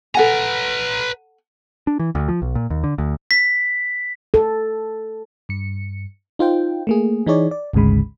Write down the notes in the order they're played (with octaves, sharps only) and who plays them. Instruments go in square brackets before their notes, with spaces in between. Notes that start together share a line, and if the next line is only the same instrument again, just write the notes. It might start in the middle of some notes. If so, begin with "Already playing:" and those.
[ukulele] A4 F#5 G#5 [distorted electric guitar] B4 A#5
[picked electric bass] D4
E3
D2
F3
B1
A#2
D#2
D3
D2
[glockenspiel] B6
[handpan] A4
[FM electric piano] G2 C#7
D#4 F4 C5 G5
A3 A#3 G#4
E3 D#4 G#4 C#5 D5
D5
G#1 D2 G#2 C#3 G#3 B5